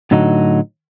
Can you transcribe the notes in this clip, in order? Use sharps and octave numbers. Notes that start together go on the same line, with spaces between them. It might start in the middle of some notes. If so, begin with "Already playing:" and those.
A2 D3 F#3 D#4 F#4